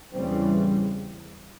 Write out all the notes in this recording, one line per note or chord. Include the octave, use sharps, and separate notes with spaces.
E2 C#3 E3 G3 C4